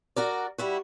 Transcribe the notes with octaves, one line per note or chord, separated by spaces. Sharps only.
F#4 A#4 D5
G3 E4 F#4